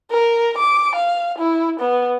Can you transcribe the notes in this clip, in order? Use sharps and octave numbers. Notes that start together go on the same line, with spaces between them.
A#4
D6
F5
E4
B3